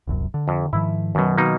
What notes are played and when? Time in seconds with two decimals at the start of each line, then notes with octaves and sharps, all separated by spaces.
0.07 D#1 C2 F#2
0.34 D3
0.48 F2
0.73 G#2 D#3 F3 E4
1.15 F#2 B2 D#3 F3 F#3
1.38 B2 A#3 D#4